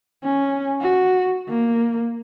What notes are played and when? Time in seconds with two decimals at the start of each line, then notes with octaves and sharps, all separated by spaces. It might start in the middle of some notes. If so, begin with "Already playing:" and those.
0.24 C#4
0.81 F#4
1.49 A#3